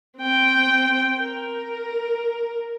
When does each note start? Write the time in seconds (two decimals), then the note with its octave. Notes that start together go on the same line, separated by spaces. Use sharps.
0.19 C4 G5
1.20 A#4